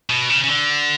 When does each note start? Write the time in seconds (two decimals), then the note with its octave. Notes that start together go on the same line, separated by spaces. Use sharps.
0.10 B2
0.30 C#3
0.43 C#3
0.48 D3